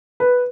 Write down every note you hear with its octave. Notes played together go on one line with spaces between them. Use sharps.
B4